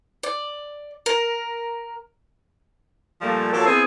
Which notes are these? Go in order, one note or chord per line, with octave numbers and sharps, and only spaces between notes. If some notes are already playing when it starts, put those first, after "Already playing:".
D5
A#4
A#2 F3 G3 A3 A#3
F3 F#3 A#3 A4 A#4
B3 C4 E4 G#4